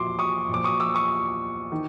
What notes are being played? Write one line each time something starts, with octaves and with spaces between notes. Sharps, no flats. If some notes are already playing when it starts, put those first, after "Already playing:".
Already playing: A#2 F3 C6 D6
C#6 D#6
A#2 F3 D6
C#6 D#6
D6 E6
C#6 D#6
D#3